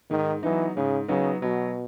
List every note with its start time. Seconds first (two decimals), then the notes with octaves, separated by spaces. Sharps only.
0.11 G#2 D#3
0.43 E3 F#3 B3 D#4
0.76 G#2 C#3
1.08 C#3 F#3 B3 D#4
1.42 B2 F#3